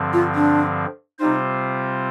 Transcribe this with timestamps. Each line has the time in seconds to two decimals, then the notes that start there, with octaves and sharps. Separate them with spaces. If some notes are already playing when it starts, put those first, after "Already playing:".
Already playing: G2 D3 F3 C4
0.13 F4
0.35 D4
1.19 C3 G3 C4 D#4 F4 C5